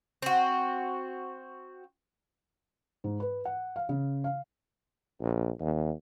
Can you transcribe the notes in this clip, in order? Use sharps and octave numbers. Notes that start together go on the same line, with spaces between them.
C4 F#4
G#2
B4
F#5
F5
C#3
F5
A#1
D#2